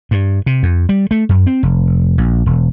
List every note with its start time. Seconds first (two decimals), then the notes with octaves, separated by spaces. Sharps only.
0.11 G2
0.46 C3
0.63 F2
0.89 G3
1.11 A3
1.29 F#2
1.47 C4
1.63 F1
2.18 A#1
2.46 E1